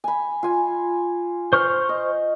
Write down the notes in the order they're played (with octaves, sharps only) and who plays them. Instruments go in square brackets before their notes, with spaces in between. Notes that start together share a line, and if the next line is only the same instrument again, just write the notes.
[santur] G#5 B5
F4 G#5
[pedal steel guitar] C5 C#6 F6
[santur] D#5